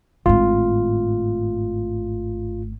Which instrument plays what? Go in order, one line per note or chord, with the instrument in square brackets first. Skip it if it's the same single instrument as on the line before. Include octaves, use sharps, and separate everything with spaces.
[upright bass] G#1 A2 [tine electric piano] F4